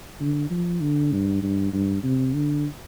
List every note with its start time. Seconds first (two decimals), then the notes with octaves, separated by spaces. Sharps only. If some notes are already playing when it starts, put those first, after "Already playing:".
0.20 D3
0.50 F3
0.81 D3
1.12 G2
1.42 G2
1.73 G2
2.03 C3
2.34 D3